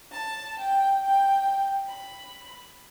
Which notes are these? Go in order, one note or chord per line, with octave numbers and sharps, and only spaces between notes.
A5
G5
G5
B5